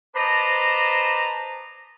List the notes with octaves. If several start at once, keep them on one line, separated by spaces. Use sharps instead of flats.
B4 C5 D5 D#5 A5 A#5